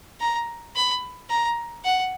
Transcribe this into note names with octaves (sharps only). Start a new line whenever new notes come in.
A#5
B5
A#5
F#5